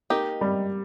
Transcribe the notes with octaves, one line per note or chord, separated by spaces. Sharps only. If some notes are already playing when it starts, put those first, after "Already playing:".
A#3 D#4 G4
G3